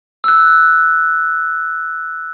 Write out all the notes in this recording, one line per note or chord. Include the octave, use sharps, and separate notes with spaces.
E6 F#6